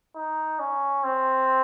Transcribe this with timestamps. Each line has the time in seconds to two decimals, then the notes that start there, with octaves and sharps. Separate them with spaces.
0.15 D#4
0.59 C#4
1.04 C4